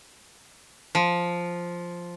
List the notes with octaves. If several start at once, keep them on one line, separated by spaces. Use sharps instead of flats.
F3